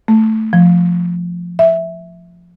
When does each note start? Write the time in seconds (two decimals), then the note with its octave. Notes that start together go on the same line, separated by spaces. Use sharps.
0.08 A3
0.53 F3
1.59 E5